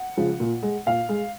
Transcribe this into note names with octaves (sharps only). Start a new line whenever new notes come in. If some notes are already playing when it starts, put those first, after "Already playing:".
Already playing: F#5
C#3 F3 G#3
A#2
G#3
A#2 F5
G#3